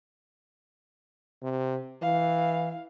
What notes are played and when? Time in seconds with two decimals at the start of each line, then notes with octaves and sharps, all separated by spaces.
1.42 C3
2.02 E3 F5